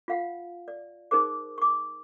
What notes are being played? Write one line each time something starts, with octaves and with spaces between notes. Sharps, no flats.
F4 F5 F#5
D5
D#4 G#4 A#4 C5 D6
C#6 D6